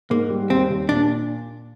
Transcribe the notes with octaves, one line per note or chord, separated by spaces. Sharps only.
G#2 A#3
G3
D#2 C4
D#2
A#2 D4